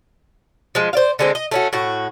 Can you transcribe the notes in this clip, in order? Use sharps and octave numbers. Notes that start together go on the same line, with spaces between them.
F3 G#3
C5 D5 F5
D3 G#3 C4
D#5
A3 C#4 F#4
A2 F#4